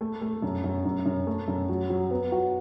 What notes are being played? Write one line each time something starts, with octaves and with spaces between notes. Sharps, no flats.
A3
A3
F#2
F#2
F#2
F#2
A3
F#2
F#3
F#3
B3
F#4